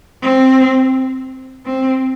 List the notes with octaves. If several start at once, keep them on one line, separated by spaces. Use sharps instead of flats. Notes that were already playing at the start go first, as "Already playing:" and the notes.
C4
C4